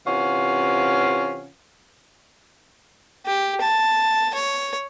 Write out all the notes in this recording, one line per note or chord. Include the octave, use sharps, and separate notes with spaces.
C3 E3 C#4 F4 F5 F#5
G4
A5
C#5